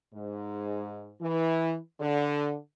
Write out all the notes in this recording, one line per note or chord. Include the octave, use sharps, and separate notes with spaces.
G#2
E3
D3